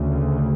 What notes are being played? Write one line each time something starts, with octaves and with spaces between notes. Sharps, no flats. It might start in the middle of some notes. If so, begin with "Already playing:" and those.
Already playing: D2 C#3